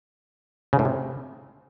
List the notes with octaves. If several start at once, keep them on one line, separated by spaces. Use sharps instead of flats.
C#3
A2
C3